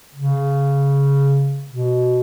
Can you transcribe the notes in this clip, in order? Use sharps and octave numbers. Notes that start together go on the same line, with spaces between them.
C#3
B2